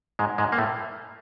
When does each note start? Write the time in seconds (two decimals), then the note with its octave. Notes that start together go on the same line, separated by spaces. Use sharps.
0.19 G#2 G#3
0.38 G#2 G#3
0.52 A#3
0.58 A2 A3